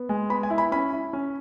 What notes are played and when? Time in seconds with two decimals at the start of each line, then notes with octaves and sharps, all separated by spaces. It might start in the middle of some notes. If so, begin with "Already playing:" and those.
Already playing: B3
0.09 G#3
0.30 B3 B5
0.43 G#5
0.50 E4
0.58 B5
0.72 C#4 B5
0.93 E4
1.13 C#4